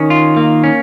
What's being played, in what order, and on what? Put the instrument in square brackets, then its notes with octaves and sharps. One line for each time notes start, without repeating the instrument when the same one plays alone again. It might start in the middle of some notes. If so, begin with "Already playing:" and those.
Already playing: [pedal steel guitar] D#3 [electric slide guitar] C#4
[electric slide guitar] F4
A#3
C#4